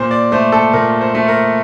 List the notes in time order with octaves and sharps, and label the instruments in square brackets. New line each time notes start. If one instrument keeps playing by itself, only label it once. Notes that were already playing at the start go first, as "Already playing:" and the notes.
Already playing: [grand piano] A#2 C5
D5
A3 C5
A4
A#2 A#4
C5
A3
A#4